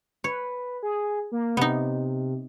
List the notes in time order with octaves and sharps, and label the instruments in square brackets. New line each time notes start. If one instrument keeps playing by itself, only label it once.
[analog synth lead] B4 [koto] C#5
[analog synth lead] G#4
A#3
[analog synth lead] C3 [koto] B3 D#4